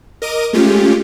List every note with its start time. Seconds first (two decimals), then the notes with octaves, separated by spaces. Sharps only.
0.22 A#4 D#5 D6 D#7
0.53 G#3 A3 C#4 F4 G4